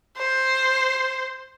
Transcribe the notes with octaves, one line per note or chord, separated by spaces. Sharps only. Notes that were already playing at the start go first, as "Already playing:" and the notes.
C5